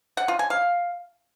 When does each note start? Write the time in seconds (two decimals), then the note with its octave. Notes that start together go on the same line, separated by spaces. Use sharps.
0.17 F#5
0.28 F4
0.39 G#5
0.50 F5